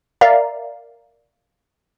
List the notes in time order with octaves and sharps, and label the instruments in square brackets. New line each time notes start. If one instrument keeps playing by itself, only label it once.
[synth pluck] A#4 D5 E5 F5 A#5